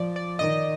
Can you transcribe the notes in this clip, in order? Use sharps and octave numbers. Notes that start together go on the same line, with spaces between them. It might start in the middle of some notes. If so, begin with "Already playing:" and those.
Already playing: F3 D5
D5
D#3 D#5